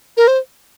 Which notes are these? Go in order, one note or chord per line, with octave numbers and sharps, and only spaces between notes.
A#4
C5